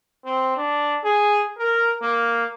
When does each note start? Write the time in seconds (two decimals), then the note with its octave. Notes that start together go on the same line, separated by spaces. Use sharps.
0.25 C4
0.57 D4
1.04 G#4
1.58 A#4
2.02 A#3